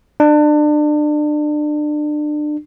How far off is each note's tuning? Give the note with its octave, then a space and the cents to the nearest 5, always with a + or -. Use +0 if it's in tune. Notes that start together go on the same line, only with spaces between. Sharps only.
D4 +30